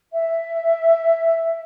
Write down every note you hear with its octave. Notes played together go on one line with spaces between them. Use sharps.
E5